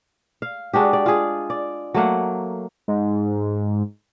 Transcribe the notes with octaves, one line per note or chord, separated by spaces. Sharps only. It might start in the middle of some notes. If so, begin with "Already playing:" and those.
F5
G#3 D4 F#4 G4
D5
F4 G#4
D5
F#3 A3 A#3 F#5
G#2